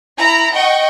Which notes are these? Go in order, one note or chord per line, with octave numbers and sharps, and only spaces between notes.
E4 A#5 B5
D#5 F#5 G5 C#6